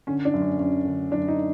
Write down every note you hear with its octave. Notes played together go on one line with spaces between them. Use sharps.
D3 C#4
D4
F#2
C#4
F#2 C#4
D3
F#2 D4
D#4